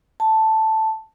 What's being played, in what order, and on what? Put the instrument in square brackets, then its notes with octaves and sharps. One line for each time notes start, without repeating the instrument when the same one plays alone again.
[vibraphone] A5